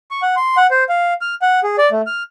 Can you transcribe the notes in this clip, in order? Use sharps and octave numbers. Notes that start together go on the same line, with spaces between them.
C#6
F#5
C6
F#5
C5
F5
F6
F#5
G#4
D5
A3
F6